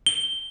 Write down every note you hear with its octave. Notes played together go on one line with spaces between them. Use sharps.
G7